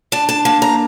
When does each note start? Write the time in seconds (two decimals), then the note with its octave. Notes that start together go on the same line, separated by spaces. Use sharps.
0.12 D4 A5
0.29 A5
0.45 A#3 A5
0.62 A#5